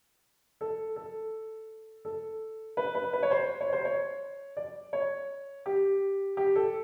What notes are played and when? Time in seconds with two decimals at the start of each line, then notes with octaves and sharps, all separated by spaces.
0.61 A4
0.96 A4
2.05 A4
2.77 B4
2.95 B4
3.13 B4
3.23 C#5
3.31 C5
3.61 C#5
3.73 C5
3.85 C#5
4.57 D5
4.93 C#5
5.66 G4
6.37 G4
6.56 A4